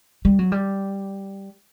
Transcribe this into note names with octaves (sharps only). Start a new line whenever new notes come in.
G3
F#3
G3